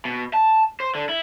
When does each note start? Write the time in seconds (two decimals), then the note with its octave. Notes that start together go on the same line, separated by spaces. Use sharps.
0.05 B2
0.34 A5
0.80 C5
0.95 D3
1.09 E4